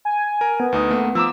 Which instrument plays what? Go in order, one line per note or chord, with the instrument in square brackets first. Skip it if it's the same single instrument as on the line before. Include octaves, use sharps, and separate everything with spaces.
[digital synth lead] G#5
[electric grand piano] A#4
[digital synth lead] B3
[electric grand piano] D2 D#4 D#6
A3 A#3
[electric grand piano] F3 A#5 D6 [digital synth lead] E6